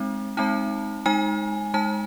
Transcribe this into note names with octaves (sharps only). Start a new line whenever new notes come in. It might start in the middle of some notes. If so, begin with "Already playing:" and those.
Already playing: G#3 C4 D#4
G#3 C4 D#4 A5
G#3 D#4 G#5
G#3 D#4 A5